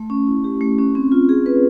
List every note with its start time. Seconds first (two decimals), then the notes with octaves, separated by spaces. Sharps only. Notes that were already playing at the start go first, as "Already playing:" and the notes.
Already playing: A3
0.10 C#4
0.27 E4
0.44 G4
0.61 A3
0.78 C#4
0.95 C4
1.12 F4
1.29 G#4
1.46 B4